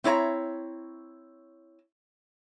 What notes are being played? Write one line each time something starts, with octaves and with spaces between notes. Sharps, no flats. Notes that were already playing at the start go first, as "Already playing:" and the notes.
C4 E4 C#5 D#5 A#5